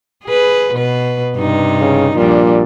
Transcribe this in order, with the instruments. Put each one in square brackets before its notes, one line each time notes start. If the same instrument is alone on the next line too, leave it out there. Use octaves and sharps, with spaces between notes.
[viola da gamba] G#4 B4
B2 B4
G2 C3 D#4
[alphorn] C#3
[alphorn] A#2 [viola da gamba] F3 G3 D4